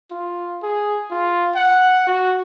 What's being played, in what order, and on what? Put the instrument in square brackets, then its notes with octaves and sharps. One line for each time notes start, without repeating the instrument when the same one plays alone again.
[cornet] F4
G#4
F4
F#5
F#4